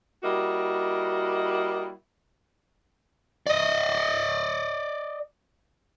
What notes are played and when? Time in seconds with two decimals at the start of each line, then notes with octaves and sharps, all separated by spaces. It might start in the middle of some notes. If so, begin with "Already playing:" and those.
0.23 G3 A#3 E4 F#4 D#5
3.47 D5 D#5